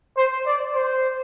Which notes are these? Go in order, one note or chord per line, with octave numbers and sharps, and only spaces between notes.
C5
D5
C5